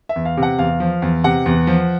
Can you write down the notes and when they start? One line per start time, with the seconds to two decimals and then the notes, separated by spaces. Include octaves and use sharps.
0.09 E5
0.16 E2
0.25 F5
0.37 C3
0.43 F#5
0.58 E2 F5
0.80 F3
1.02 E2
1.24 C3 F#5
1.46 E2
1.67 F3